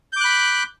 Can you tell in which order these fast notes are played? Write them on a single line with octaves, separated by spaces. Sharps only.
G6 D6 F#6 B5